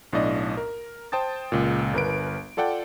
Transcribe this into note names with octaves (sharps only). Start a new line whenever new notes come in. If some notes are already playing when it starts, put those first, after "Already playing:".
B1 A2 D4 D5 D#5
A#4
C5 G5 A5 D#6 A6
C#2 A#2
G1 A#4 B4 D7
F4 A4 D5 F#5 G5